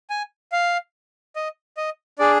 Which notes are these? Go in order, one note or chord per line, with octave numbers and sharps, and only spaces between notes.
G#5
F5
D#5
D#5
D4 G#4 D5